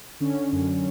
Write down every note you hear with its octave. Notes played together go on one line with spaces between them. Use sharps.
D3 C#4
F#2